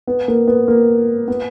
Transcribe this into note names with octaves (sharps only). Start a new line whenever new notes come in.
B3
A#3
B3
A#3
B3